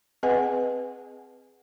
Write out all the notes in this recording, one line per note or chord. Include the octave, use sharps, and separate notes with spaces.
C4 G#4 B4 D#5 F#5 G#5